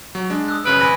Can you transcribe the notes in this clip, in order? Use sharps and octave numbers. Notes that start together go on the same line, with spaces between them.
F#3
G#3 D4
D#6 E6 F#6
F#2 C#3 B4 D7
G#1 G#5 B5 A#6